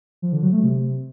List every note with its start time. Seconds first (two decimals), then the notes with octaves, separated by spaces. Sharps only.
0.22 F3
0.32 D3
0.43 F#3
0.53 A3
0.63 C3